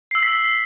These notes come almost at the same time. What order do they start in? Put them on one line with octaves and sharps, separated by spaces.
C7 E6 F#7 B6